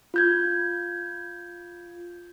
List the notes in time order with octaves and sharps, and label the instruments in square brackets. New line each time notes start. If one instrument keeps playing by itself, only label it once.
[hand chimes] F4 G6 G#6